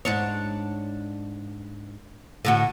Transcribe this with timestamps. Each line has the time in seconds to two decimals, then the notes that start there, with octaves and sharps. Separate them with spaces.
0.05 G#2 D4 C#5
2.45 A2 D3 F#4